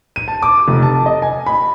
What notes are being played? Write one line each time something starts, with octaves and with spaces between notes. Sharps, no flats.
D#7
A5
D6
F1
A5
D#5
G#5
B5